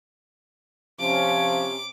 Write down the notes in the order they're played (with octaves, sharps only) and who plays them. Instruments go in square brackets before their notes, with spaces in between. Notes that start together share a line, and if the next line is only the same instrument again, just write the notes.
[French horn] C3 [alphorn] F3 [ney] C#4 [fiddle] D6